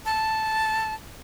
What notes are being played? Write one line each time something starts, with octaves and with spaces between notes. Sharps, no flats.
A5